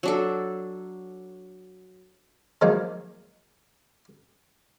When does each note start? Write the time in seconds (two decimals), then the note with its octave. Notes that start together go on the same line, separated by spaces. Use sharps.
0.03 F#3 D4 A4
2.61 D#3 F3 F#3 G#3 A#3 D#4